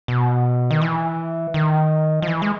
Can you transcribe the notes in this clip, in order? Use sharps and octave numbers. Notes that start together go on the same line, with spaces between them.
B2
D#3
E3
D#3
F3
E3
G#3